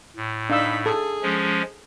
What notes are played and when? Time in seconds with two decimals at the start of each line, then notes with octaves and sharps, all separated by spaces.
0.16 A2
0.50 D4 D#4 F5 B5 E6
0.86 G#4 A4
1.23 F3 G#3 C#4